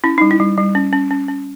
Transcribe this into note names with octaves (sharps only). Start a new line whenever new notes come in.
C#4 E4
G3 D#4
E4
G3
G3
C#4
C#4
C#4
C#4